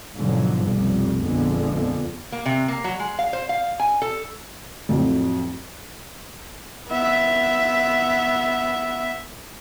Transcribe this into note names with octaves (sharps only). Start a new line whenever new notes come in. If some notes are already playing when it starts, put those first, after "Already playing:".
G#2 B2 D3 F3 F#3
F1 B1 F2 G3
A#1 F2 D3 F3 G#3 B3
A#3
C3
A#3
F#3
G#3
F5
C5
F5
G#5
A4
F2 A2 F#3
B3 E5